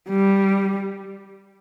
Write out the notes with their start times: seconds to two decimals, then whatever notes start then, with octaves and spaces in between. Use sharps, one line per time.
0.09 G3